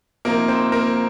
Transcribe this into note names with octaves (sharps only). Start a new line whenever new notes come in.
C3 F3 A#3 C4 D#4 A#4
C4 C5
A#3 A#4